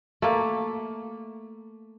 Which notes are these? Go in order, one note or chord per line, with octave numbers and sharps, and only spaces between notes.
A3 A#3